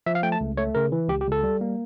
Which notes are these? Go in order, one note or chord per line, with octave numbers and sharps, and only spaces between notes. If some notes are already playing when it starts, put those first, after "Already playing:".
F3 E5
F5
A3 G5
A5
C#2
A3 C#5
C#3 A#4
E3
C#2 G4
G4
C#2
A4
G3
A#3